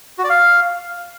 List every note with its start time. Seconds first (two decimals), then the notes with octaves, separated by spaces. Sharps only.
0.19 F#4
0.24 D5
0.30 F5